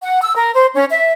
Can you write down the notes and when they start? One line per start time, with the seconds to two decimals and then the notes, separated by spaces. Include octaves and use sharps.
0.02 F#5
0.23 E6
0.36 A#4
0.54 C5
0.75 C#4
0.90 E5